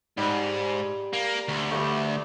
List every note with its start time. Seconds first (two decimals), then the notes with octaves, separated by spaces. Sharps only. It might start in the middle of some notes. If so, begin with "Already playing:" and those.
0.17 G#2 G3
1.13 A#3
1.48 D2
1.71 G2 A3